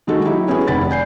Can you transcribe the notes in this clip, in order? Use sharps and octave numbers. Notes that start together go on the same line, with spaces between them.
D#3 G#3 D#4 F#4 A4
F#3 D#4 E4 G4
B3 C#4 E4 F#4 G#4
F1 D#3 F#5 B5 A6
D5 G#5 G6 C7